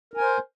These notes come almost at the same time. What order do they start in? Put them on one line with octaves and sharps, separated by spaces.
A#4 G#5 C5